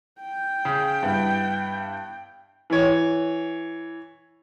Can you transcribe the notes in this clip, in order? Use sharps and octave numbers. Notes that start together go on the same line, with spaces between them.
G5
C#3
G2 B3 E4
E3 C#5